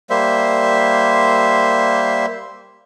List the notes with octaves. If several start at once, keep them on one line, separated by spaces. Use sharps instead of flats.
G3 A#3 C5 E5